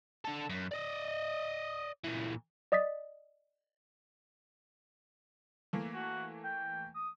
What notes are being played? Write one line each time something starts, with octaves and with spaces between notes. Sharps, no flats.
D3 A4
F#2
D5 D#5
A#2 E3
D5 D#5 D#6 A6 B6
E3 A3 A#3
F#4
G5
D#6